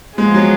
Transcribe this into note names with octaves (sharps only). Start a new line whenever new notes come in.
F3 G#3 B3 F4 G#4
F#3